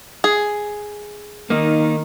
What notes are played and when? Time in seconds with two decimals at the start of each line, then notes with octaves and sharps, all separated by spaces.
0.24 G#4
1.50 D#3 A#3 D#4